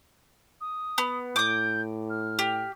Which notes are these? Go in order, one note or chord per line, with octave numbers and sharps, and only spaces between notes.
D#6
B3
A2 D6 D#6 G6
F6
G4